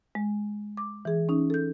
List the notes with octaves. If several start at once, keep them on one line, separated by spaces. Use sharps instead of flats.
G#3
D6
E3 G#4
C#4 D#4
A4 G6